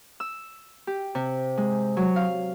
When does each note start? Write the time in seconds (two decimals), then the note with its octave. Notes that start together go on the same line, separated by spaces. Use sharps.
0.20 E6
0.87 G4
1.15 C3
1.58 G#3
1.97 F#3
2.16 F5